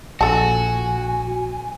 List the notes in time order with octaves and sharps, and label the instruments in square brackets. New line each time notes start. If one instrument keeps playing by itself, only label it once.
[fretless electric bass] A#1 [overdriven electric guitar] F#4 [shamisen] A4 A5 [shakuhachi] G#5